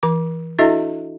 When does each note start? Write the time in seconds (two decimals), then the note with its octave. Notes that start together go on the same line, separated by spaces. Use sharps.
0.03 E3 D6
0.59 D4 E4 F#4 A4 D#5 E5